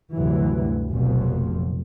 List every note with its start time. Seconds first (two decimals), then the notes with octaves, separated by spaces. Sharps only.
0.15 D2 G2 C3 E3 F#3
0.91 F1 A#1 F2 B2 F3 F#3